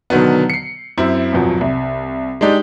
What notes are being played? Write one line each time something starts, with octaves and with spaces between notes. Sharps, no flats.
B2 D3 D#3 F#3 B3
C7 C#7
F#2 C4 E4
G#1 E2 B2 F3 F#3
C2
G#3 D4 D#4 G4